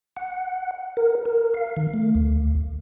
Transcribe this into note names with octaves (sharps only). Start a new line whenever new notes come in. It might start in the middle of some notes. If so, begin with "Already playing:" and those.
F#5
A#4
A#4
F5
D#3
A3
D2